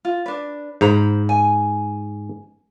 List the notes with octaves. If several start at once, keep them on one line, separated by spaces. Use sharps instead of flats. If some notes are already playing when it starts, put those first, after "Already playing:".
F4
D4 B4
G#2 C5 A#5 B5
G#5